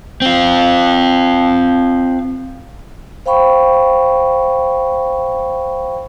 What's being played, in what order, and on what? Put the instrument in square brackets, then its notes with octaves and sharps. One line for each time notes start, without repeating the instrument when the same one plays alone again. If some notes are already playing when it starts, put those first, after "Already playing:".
[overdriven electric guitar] C4 F4
[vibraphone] C5 F5 G5 B5 C#6